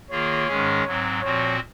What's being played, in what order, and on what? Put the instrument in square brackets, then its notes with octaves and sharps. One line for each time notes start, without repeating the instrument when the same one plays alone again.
[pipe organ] D#3 A#3 F4 G#4 [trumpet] C#5
[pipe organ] G#2 D#3 G#3 C#4 G#4
G#2 F#3 C4
[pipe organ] A#2 F3 C4 F#4 [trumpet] C#5